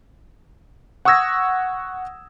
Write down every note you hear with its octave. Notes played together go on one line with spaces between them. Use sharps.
F#5 C#6 D#6 E6 G#6 A#6